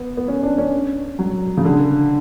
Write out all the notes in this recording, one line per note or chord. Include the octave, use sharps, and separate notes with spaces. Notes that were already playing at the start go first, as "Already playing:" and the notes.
Already playing: B3
B3
C#4
D4
C#4
F#3
C#3
D3